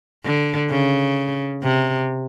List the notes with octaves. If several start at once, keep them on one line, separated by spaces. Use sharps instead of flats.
D3
C#3
C3